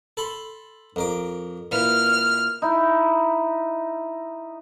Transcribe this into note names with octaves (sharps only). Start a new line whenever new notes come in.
A4 B5 C6
F2 A#4 D6
A#2 E3 F6
D#4 E4